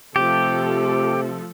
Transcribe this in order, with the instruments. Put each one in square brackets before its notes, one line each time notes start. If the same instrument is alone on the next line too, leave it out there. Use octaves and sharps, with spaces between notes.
[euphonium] C3 [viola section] F3 A3 A4 [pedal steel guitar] G4